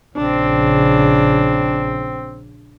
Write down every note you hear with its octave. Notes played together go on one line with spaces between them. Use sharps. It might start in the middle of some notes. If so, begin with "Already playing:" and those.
A#1 C#3 C4 D4